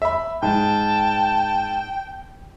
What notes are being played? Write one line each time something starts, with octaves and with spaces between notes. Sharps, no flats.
E5 B5
G#2 G5 A5